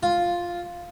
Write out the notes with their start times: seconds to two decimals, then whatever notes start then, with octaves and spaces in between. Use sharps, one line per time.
0.03 F4